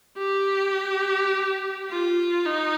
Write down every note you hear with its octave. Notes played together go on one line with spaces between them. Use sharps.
G4
F4
D#4